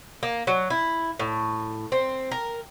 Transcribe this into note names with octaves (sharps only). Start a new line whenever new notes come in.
A#3
F#3
E4
A2
C4
A#4